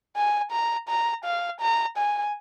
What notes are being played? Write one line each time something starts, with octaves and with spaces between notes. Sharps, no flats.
G#5
A#5
A#5
F5
A#5
G#5